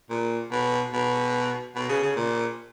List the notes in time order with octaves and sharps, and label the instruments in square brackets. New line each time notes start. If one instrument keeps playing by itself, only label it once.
[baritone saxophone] A#2
B2
B2
B2
C#3
C#3
A#2